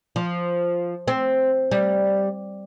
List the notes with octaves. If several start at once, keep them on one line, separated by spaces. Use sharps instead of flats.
F3
C4
G3